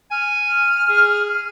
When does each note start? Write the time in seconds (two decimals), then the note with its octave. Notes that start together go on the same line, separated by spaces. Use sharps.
0.11 G#5 F6
0.89 G#4